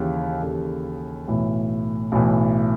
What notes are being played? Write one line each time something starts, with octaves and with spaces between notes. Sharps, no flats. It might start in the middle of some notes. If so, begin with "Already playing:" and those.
Already playing: D#2 C#3 E3 G4
D#2 C#3 E3 A4
B1 A2 E3
B1 A2 E3